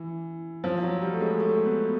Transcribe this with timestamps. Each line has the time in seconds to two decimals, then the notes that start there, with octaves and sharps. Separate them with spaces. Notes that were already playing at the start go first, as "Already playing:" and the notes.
Already playing: E3
0.64 F3
0.83 F#3
1.02 G3
1.13 A3
1.21 G#3
1.40 A3
1.65 B3